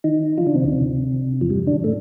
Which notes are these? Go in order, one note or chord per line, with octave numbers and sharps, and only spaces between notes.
D#3 D#4
F3 F4
D3 D4
C3 C4
D2 D3
C3
F2 F3
G2 G3
D3 D4
A2 A3